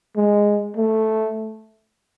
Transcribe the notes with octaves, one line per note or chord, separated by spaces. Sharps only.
G#3
A3